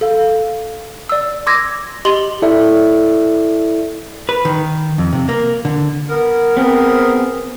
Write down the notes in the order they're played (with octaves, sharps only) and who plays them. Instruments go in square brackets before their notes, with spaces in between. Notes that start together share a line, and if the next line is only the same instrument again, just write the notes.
[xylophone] A4 F5
D5 E6
C6 D6 E6 G#6 A#6
G4 D#5 C6 A6 F#7 G7
[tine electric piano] E4 A4 D5 E5
[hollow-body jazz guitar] B4
D#3
F2
C3
A#3
D3
[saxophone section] B3 A#4
[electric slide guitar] B3 C4 [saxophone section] G#4 A#4